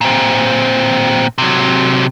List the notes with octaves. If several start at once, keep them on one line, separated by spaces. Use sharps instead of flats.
A#2 C4
C3 F#3